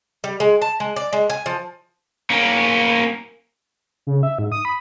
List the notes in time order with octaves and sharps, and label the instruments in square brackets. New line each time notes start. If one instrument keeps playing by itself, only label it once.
[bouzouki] G3
G#3
A5
G#3
D5
G#3
G#5
F3
[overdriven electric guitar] A#3 C#4
[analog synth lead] C#3
E5
G#2
D#6
B5